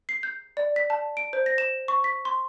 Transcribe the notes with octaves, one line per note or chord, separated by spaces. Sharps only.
C7
G6
D5
B6
A5
D7
C5
A#6
E7
C#6
B6
C6